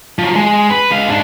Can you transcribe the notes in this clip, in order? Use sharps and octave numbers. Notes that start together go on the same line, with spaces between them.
F3 F#3
G#3
B4
G#3 F5
G#2 D4